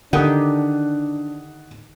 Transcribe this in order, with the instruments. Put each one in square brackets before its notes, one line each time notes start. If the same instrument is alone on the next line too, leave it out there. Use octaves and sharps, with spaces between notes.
[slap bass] D3 [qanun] D#3 G4 D#5 [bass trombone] D4 [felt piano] F#5 D#6